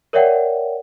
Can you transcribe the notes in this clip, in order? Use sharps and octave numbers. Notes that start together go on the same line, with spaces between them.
A#4 C#5 D5 E5 F#5 G5